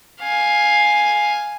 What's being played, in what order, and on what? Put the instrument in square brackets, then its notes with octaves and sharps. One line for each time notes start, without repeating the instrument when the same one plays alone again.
[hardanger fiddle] F5 G#5